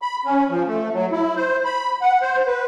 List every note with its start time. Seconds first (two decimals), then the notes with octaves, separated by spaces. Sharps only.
0.02 B5
0.25 C#4
0.50 F3
0.67 A3
0.94 F#3
1.12 E4
1.36 C5
1.65 B5
2.01 F#5
2.21 C5
2.47 B4